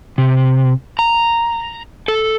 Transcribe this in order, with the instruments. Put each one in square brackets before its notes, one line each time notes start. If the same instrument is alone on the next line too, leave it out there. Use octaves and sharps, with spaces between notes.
[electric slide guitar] C3
A#5
A4